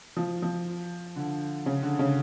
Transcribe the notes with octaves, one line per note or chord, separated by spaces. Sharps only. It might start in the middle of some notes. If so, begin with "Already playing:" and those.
F3
F3
D3
C#3
D3
C#3